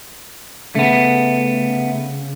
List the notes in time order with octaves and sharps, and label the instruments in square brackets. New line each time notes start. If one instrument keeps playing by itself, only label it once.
[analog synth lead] C#3 [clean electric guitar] A3 B3